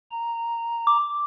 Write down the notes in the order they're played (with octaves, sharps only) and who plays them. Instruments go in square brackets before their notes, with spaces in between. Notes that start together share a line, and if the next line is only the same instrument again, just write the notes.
[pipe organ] A#5
[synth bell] D6